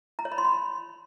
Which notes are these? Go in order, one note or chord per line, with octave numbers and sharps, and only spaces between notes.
A#5
C#5
B5
C6
B5